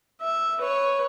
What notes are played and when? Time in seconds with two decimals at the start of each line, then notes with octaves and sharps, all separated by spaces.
0.21 E5
0.59 B4 C#5